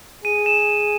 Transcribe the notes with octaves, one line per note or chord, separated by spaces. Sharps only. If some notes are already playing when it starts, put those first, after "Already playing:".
G#4 D#7
E7